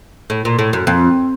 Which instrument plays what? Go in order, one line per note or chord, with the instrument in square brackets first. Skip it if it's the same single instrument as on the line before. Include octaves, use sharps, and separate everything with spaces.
[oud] A2
A#2
A2
F#2
F2